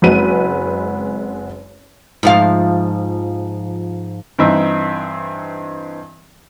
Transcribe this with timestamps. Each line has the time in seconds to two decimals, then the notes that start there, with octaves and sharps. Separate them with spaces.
0.02 F#1 G#3 C4 F#4 B4 D#7
2.23 G#2 F3 F5
4.39 G2 E3 C4 D#4 E5